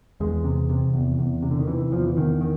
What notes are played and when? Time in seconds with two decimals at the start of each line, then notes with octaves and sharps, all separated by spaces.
0.20 E2 G#3
0.44 C3
0.69 C3
0.94 E2
1.19 E2
1.42 C3
1.51 D3
1.59 D#3
1.67 C3 E3
1.92 E2 F3
2.06 E3
2.17 E2 D#3
2.41 D#3